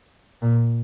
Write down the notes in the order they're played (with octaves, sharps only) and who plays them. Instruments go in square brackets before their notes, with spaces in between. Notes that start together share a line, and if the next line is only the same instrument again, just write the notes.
[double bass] A#2